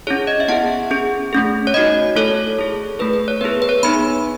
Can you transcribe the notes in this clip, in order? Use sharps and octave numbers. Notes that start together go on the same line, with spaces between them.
C#4 E4 G#4 C#5
D#5
E5
B3 E4 G#4 F#5
C#4 G#4
A3 C#4 G#4
C#5
A3 D#4 F#4 D#5
A3 E4 A4 C#5
A3 E4 G#4
A3 E4 G#4 B4
B4
C#5
B3 E4 G#4 B4
B4
C#5
B3 D#4 G#4 B5